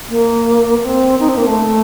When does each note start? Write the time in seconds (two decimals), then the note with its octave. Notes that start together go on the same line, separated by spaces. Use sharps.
0.09 A#3
0.83 C4
1.20 D#4
1.29 C4
1.37 A#3
1.47 A3